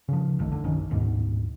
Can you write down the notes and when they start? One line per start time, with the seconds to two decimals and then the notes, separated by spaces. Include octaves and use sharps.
0.08 C#3 F3
0.39 F1 B1 D#3 A3
0.52 D3
0.64 F#1 B1 D#3 C#4
0.90 D1 D2 G#2 B2